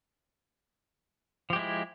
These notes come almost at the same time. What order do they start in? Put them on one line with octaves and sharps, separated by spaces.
F3 G4 G#3 E4